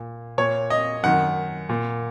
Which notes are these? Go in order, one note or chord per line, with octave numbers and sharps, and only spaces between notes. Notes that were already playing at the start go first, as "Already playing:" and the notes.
Already playing: A#2
A#2 C#5
D#5
F#2 D#3 F#5
A#2